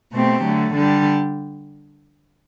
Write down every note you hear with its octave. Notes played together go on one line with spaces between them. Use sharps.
B2 A3 C4 G4
D3 F#3 A3
D3 G3 D4 G4